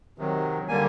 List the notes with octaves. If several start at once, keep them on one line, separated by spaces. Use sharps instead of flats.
C3 D#3 F#3
D3 G3 A#3 G#5